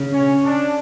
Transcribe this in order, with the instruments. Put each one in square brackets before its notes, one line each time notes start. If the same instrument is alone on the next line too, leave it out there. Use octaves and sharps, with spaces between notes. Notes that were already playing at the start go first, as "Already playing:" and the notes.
Already playing: [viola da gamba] C#3
[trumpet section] C#4
D4